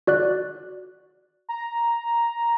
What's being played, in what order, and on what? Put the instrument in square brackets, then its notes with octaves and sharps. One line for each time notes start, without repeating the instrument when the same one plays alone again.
[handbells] F#4 D5 F#6
[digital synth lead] A#5